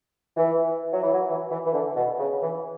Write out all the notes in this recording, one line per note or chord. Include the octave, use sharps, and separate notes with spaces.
E3
F#3
E3
F#3
E3
E3
E3
D3
B2
C#3
E3